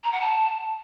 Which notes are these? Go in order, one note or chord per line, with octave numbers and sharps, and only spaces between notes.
A#5
F#5
A5